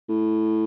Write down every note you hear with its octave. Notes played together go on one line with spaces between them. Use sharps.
A2